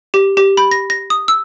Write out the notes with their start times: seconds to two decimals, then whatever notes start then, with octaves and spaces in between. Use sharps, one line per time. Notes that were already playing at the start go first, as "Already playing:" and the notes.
0.14 G4
0.37 G4
0.57 B5
0.71 A#6
0.90 A#6
1.10 D#6
1.28 E6